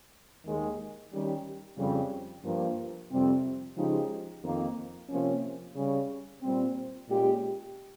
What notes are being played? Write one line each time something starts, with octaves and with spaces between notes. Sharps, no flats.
D#2 D#3 G#3
D#3 G3 C#4 G4
F2 C#3 G3
G2 F3 A#3
F2 C3 G3 C4
C#3 F3 G#3 D#4 G4
F2 D#3 A#3
C3 F3 A#3 C#4
C#3 G3 C#4
A#2 G3 C4
A#2 G#3 C#4 G4